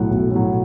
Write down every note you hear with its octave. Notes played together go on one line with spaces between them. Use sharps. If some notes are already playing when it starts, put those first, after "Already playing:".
Already playing: B1 A2 F#3 F#5
B1
A2 F#3